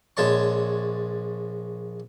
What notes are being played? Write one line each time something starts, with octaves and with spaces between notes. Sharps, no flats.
A#1 G#3 C#5 A5 C#6